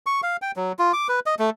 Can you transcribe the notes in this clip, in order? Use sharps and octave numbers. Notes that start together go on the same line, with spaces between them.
C#6
F5
G5
F#3
F4
D6
B4
D#5
A3